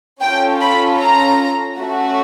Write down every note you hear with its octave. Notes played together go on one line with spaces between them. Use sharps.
C#4 F4 A4 G5
B5
A#5
A3 C#4 F#4